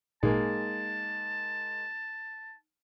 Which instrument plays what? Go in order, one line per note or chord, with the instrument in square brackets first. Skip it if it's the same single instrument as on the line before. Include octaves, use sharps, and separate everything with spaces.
[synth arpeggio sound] G#1 A#2 [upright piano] G#3 A#3 [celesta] D#4 [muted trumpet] A5